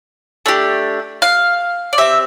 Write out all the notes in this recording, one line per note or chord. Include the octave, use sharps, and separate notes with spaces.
A3 D4 G4
F5
D5
C4 G4 E5